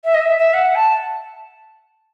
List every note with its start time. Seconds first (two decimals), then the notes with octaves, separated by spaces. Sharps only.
0.05 E5
0.14 D#5
0.21 E5
0.38 E5
0.54 F#5
0.75 A5